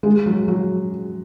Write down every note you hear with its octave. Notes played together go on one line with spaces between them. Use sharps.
G#3
F#3
F#3